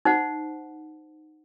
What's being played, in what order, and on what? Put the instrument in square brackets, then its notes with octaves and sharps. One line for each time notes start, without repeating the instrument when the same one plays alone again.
[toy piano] D#4 C5 F#5